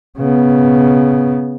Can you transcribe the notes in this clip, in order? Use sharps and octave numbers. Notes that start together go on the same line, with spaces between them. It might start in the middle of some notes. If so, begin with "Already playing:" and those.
C#3 B3